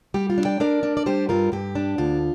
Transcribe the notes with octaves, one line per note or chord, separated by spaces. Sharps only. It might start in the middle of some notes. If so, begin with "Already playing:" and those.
G3 G4
F4
D4
D5 G5
D4 A#4 D5
D4
D5
G3 G4 C5
G2 F4 A#4
G2 G4
D4
D2 F4